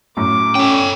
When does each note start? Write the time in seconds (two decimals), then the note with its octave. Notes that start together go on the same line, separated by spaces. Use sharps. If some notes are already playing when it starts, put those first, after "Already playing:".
0.17 F#2 A2 D6
0.55 C#4 A4 G5